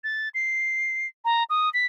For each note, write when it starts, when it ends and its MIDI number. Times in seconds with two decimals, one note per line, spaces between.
0.04 0.29 93
0.35 1.07 96
1.25 1.44 82
1.50 1.69 87
1.74 1.86 95